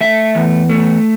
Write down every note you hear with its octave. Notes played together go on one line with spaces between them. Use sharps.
A3 E5
E2
A3